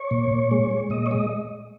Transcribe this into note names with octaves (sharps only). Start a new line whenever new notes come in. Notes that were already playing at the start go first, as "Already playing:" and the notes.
Already playing: C#5
A#2
A#2
G#3
G#3
A#2 D#5
C#5
G#3 D#5